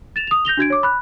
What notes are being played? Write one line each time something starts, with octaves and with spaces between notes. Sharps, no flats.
A6 E7 F7
D#6 F7
G6 A#6 F7 G7
D4 F#4 G#6 D7
C#5 D6
B5 F#6